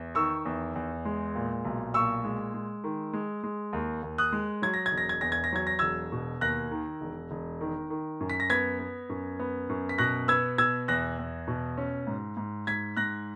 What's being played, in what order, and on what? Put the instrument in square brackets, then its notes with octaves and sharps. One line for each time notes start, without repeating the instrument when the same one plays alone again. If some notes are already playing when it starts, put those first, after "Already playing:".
Already playing: [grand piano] E2
D#3 C#6 E6
E2
E2
G#3
A#2
B1
A#2 C#6 E6
G#3
G#3
D#3
G#3
G#3
D#2
D#2
D#6 F#6
G#3
F#3 G#6
A#6
G#6
E1
A#6
G#6
E2 A#6
G#6
A#6
F#3 G#6
A#6
E1 E6 G#6
B2
D#2 F#6 A#6
D#3
E1
E1
D#3
D#3
F#2
B6
A#6
B3 G#6 B6
B3
F#2
B3
F#2
B6
B2 F#6 A#6
B3 E6 G#6
B2 E6 G#6
E2 F#6 A#6
E2
B2
C#4
G#2
G#2
G#2 G#6 B6
G#2 F#6 A#6